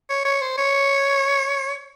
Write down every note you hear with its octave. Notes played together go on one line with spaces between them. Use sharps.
C#5
C#5
C5
C#5